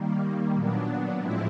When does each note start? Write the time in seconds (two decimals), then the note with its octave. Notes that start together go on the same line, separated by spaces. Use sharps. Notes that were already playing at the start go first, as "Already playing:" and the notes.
Already playing: D#3 G3 A#3
0.53 A#2 F#3 B3 D4
1.18 A2 F3 G#3 C4 E4